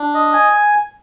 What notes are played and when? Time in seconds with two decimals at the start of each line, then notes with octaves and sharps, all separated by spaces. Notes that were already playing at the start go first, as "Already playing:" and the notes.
Already playing: D4
0.14 D#5
0.33 G#5